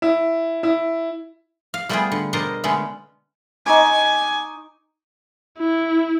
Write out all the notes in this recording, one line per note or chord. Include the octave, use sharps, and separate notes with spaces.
E4
E4
F5
G3 A3 B3 F4 G4 G#4
D3
B2 D4 A#4 C5 D#5
D3 G#3 A3 B3 C#4
D#4 G#5 C#6 D6
E4